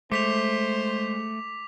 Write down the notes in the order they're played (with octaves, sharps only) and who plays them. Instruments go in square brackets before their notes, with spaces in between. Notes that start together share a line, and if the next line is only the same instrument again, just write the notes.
[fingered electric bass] G#3 [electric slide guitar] A3 [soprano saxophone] C5 [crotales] D6 B6 F7